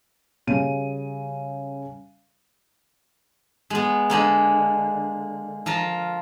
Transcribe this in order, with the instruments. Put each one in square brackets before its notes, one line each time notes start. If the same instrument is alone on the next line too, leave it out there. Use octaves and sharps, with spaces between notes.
[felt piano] C#3 G3 D#7
[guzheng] G#3 B3
D3 G#3 A#3
F3 F4 A#4